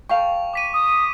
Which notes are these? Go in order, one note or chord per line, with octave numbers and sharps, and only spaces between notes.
A4 F5 G5 C#6 F7
D6 B6 D#7
D#6